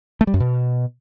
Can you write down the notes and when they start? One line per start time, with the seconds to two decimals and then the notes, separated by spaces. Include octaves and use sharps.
0.21 A3
0.27 G3
0.34 F#2
0.40 B2